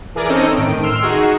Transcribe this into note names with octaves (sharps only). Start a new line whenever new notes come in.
E3 G#4 A#4 D5
C4 C#4 D#4 A4 D#5
A2 D#3 D7
C6 E6 F6
D#4 F#4 G#4